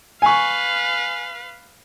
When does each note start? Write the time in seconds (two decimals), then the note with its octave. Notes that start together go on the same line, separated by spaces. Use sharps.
0.22 B4 F5 G#5 C#6